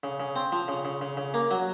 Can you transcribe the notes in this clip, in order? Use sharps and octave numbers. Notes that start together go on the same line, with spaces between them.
C#3
C#3
C4
F3
C#3
C#3
C#3
C#3
A#3
F#3